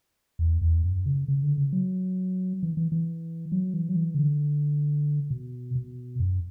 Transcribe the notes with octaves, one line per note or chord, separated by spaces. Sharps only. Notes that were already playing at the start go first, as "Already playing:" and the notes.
E2
E2
F#2
C#3
C#3
D3
C#3
F#3
E3
E3
E3
F#3
E3
F#3
E3
C#3
D3
B2
B2
F#2